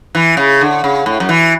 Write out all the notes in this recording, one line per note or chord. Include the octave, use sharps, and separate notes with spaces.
E3
C#3
D3
C#3
A2
F#2
E3